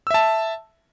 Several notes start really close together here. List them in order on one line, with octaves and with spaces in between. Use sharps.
E6 E5 A5